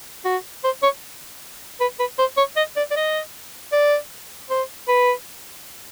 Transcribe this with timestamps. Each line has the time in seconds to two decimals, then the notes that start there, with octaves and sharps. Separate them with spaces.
0.25 F#4
0.64 C5
0.83 C#5
1.80 B4
1.99 B4
2.19 C5
2.37 C#5
2.57 D#5
2.77 D5
2.91 D5
2.96 D#5
3.72 D5
4.50 C5
4.88 B4